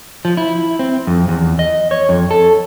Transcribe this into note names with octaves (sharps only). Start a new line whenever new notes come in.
F3
E4
C4
F2
E2
D#5
C#5
F2
A4